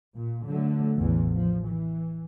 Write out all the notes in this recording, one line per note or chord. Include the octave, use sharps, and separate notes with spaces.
A#2
D3 F#3 A3
A1 E2 E3
F3
E3